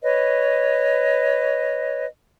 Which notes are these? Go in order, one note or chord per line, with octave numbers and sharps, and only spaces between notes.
B4 C#5 D#5